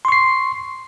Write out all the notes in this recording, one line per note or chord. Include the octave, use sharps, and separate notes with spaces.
C6 C#6 C7